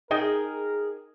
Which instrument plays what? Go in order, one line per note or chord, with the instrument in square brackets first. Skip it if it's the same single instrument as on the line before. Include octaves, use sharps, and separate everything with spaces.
[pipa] D#4 G5 [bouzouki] G#4 [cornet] A#4 [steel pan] D#5